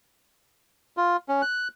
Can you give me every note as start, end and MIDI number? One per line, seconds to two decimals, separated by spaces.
0.97 1.17 65
1.29 1.42 61
1.42 1.68 90